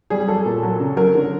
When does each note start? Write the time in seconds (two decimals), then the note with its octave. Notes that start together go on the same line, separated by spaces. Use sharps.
0.10 G3 G#4
0.28 F#3 A4
0.46 A#2
0.63 F#3
0.80 C#3
0.97 F#3 A#4
1.15 D3